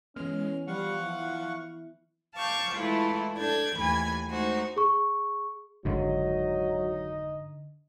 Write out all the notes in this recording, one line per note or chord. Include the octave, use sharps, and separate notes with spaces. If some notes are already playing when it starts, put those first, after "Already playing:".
E3 G#3 B3 C#4 F6
F3 G3 F5 F#5 C#6
E4
F5 A5 C#6 D6 G6
E3 G#3 A3 E4 F4
D4 A4 G6 G#6
D#2 E3 A3 G#5 B5 G#6
G#3 A3 D#4 F#4 C5
G#4 C#6
G#1 F2 G#2 D3 F#3 D#4 D#5